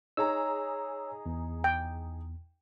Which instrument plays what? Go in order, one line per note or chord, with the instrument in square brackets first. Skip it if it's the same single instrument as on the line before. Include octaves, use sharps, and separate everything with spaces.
[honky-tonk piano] D#4 G#4 A#5 [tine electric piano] C#5 E6
[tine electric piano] E2
[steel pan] G5